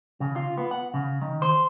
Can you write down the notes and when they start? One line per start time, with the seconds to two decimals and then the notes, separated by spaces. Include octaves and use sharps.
0.20 C#3
0.36 F4
0.58 B3
0.71 F#5
0.94 C#3
1.21 D#3
1.42 C5